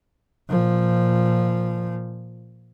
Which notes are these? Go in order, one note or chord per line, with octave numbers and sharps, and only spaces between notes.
A#2 F3